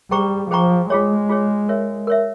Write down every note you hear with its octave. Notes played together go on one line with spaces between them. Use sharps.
G3 G#4 C5 G5 A#5 C#6
F3 G#4 C5 G5 A#5 C#6
G#3 F4 G#4 C#5
F4 G#4 C#5
A#4 C#5 E5
A#4 C#5 E5